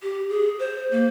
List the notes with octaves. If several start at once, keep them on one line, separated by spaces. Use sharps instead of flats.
G4
G#4
C5
A#3